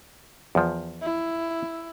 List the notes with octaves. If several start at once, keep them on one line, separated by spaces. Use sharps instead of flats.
E2 F3
E4